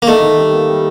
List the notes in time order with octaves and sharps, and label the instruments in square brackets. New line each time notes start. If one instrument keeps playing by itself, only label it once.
[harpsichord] A#3
[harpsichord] A3 [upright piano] D#4
[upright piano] D#3
G3
A#3
G3